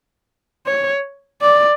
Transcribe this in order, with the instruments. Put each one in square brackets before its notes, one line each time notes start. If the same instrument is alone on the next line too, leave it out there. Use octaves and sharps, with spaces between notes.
[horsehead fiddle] C#5
D5